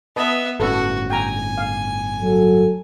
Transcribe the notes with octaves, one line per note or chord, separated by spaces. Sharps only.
B3 B4 D#5 E5 A5
G1 A2 C#4 F#4 A4 B4
G5 G#5 A#5
F5
F#3 A4